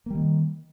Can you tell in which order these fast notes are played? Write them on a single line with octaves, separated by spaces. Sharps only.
A#3 G3 D#3